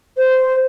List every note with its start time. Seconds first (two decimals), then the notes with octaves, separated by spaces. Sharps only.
0.18 C5